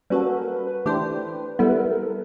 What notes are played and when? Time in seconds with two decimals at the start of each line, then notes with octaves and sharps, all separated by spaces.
0.10 G3 A#3 C#4 F#4 A4 B4
0.20 A#4
0.29 B4
0.38 A#4
0.48 B4
0.66 B4
0.86 E3 A3 D4 G4 C5
1.59 G3 B3 E4 A4
1.69 B4
1.79 A#4
1.90 A4
1.97 A#4
2.06 A4